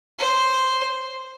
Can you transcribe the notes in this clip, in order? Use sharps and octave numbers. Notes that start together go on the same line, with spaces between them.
C5